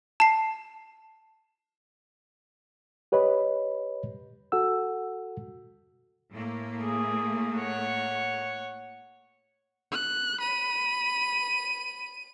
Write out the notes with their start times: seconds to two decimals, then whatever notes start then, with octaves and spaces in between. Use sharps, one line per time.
0.20 A5 C7
3.12 G4 B4 C#5 D#5 B5
4.52 F#4 A4 F#5 E6
6.31 A2 A3 A#3
6.82 G#4
7.57 C#5 F#5
9.92 F#6
10.41 B5 D#7